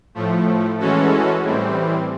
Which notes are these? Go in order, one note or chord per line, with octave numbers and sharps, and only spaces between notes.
A2 F3 A3
E3 G#3 C#4 F#4 A4
A2 E3 G3 C4